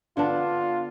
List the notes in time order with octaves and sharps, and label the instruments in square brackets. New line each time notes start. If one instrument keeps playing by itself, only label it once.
[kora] D3 B3 D4 [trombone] F4